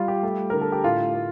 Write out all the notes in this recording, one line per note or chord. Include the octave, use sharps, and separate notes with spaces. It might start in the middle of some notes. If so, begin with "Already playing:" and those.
Already playing: G3 F4
G4
A3
D3 A#4
A4
G4
A2 F4
A3